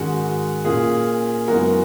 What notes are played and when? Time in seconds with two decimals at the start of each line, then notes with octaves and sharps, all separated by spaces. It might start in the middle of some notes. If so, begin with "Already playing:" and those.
Already playing: G#2 D#3 G#3 C#4 F#4
0.65 A#2 A#3 C#4 G#4
1.48 F#2 C#3 E3 G#3 B3 F#4 A#4